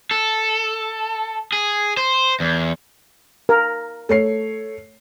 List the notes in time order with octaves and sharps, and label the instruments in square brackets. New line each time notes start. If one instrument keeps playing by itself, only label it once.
[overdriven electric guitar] A4
G#4
C5
E2
[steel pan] A#4
[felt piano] A3 C#5 C7